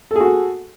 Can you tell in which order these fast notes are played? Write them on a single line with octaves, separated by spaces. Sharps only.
A4 G#4 F#4